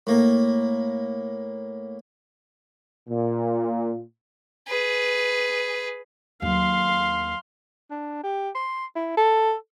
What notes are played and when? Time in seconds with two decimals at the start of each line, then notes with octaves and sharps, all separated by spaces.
0.07 A2 A#3
3.08 A#2
4.68 G#4 B4
6.42 D#2 F#3 F5 C6
7.91 D4
8.24 G4
8.55 C6
8.96 E4
9.17 A4